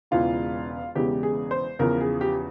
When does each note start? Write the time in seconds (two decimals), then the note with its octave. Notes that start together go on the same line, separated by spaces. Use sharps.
0.11 E1 E2 C#3 E3 G#3 F4
0.95 E1 E2 C#3 E3 G#3 G4
1.23 G#4
1.51 C5
1.79 E2 C#3 F3 A#4
2.01 G#4
2.21 G4